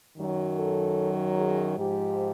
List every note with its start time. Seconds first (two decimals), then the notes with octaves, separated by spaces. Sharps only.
0.17 F#2 D#3 F#3
0.57 A4
1.38 G#4
1.77 G#2 F3 G4